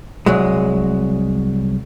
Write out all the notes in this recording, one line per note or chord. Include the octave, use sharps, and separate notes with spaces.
C2 F#3 G#3